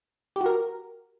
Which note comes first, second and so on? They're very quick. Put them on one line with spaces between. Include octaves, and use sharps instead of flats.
G4 F#4 A#4